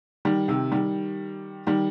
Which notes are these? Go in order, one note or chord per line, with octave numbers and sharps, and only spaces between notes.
D#3 G3
C3 D#3
D#3 G3
D#3 G3